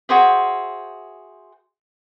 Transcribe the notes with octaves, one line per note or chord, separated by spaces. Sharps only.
F#4 G#4 C5 E5